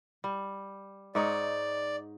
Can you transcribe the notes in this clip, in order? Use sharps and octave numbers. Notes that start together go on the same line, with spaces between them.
G3
G#2 D#4 C#5 D5